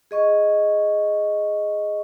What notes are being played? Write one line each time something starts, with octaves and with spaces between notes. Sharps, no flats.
G#4 D#5 C#6